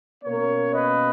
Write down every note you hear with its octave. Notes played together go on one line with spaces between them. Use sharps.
B2 A#3 C#4 A#4 C#5
B4 D#5